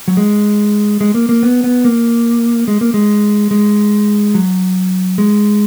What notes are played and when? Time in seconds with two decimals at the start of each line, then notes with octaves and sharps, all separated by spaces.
0.08 F#3
0.17 G#3
1.01 G#3
1.15 A#3
1.29 A#3
1.43 B3
1.64 B3
1.84 A#3
2.68 G#3
2.81 A#3
2.94 G#3
3.51 G#3
4.34 F#3
5.18 G#3